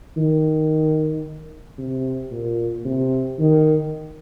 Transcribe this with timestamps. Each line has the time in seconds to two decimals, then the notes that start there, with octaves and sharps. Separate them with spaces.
0.17 D#3
1.78 C3
2.31 A#2
2.85 C3
3.39 D#3